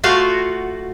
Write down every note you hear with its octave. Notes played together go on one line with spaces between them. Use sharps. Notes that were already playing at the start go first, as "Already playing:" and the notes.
A3 F4 F#4 F5